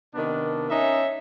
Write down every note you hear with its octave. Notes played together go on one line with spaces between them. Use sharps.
C3 D#3 B3 D4
C#4 D#4 C#5 E5